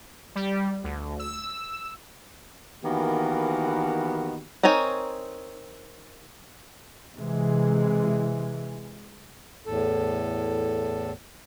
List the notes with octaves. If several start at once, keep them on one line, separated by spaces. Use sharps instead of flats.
G3
D2
E6
D#3 E3 A#3 B3 F#4 G4
C4 D#4 A#4 C#5 G#5
C3 E3 G#3
E2 A2 A4